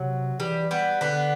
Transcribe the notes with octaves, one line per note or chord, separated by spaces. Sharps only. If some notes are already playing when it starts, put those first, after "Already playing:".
Already playing: C3 F#3
E3 G3
G3 B3
D3 B3 D4